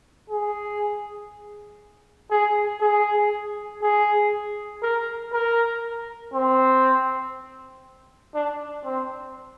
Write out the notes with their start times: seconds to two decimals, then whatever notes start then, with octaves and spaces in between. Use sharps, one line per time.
0.30 G#4
2.31 G#4
2.81 G#4
3.82 G#4
4.83 A#4
5.33 A#4
6.34 C4
8.34 D4
8.85 C4